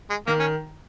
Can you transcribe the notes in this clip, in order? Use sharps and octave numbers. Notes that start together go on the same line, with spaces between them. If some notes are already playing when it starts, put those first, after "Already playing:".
G#3
D#3 A#3
C#4